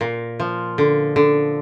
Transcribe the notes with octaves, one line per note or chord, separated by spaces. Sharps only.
A#2
F3
D3
D3